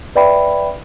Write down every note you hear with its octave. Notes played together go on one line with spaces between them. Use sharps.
B4 D5 E5 G5 B5